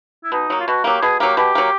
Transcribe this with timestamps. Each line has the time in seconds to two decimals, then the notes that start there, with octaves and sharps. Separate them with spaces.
0.24 E4
0.32 B2 D#4
0.50 F#3 A#3
0.60 F4
0.67 B2 F#4
0.84 F#3 A#3 G4
1.02 B2 G#4
1.20 F#3 A#3 G4
1.37 B2 G4
1.55 F#3 A#3